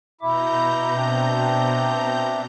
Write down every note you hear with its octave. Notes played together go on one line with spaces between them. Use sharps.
B2 E4 E5 A#5 D6 G6
C4 D4